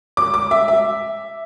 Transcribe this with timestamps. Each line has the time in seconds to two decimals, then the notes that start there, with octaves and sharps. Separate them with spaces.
0.17 D6
0.34 D6
0.51 E5
0.68 E5